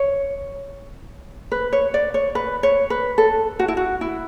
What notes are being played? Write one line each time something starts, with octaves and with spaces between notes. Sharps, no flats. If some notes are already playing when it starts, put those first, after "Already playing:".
Already playing: C#5
B4
C#5
D5
C#5
B4
C#5
B4
A4
F#4
E4
F#4
E4